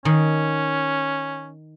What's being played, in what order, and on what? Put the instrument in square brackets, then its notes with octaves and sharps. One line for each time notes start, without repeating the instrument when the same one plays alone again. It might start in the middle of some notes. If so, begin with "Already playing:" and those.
[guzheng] D#3 [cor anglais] C#4